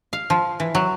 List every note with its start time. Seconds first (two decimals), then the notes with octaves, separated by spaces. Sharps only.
0.13 F5
0.30 F3
0.60 E3
0.75 F#3